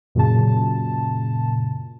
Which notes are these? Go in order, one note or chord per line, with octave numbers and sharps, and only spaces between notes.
F#2 A#2 C#3 A5